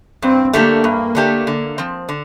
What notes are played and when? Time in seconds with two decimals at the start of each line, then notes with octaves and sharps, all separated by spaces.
0.22 G2 C4
0.53 D3 A3 A#3 D4 G4
0.84 G2
1.15 D3 A3 D4 G4
1.47 D3
1.78 F3 C4
2.09 D3